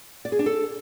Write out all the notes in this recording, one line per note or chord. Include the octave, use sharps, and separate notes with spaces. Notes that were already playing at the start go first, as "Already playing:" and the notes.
D5
G#4
D4
A4